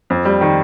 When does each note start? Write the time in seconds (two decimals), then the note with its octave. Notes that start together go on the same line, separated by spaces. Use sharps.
0.10 F2
0.25 G3
0.41 D#3